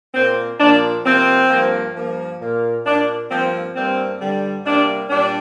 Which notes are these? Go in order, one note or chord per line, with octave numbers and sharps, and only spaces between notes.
A#2 A#3 C4
A#2 F3 A#3 D4
C3 F3 A#3 C4
G2 F3 A#3
G2 F3 A#3
A#2 A#3
A#2 A#3 D4
G2 F3 A#3 C4
G2 G3 A#3 C4
G2 D3 G3
C3 G3 A#3 D4
A#2 G3 D4